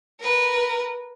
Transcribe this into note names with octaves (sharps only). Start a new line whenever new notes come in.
A#4 B4